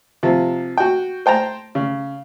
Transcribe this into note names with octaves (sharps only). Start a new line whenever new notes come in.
C3 F3
F#4 G5
C5 G5 A5 A#5
C#3